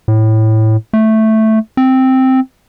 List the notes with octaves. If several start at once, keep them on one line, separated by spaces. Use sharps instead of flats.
A2
A3
C4